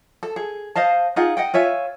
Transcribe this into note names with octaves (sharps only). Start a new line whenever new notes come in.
A4
G#4
C5 D#5 F5 A5
D#4 F4 G#4 F#5
D#5 F#5 G5
F4 C#5 E5 G#5